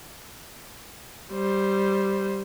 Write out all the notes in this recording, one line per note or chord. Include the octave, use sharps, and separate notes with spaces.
G3 C5